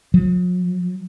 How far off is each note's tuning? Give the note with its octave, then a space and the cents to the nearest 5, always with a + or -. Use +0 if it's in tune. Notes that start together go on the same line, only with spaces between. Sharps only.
F#3 -45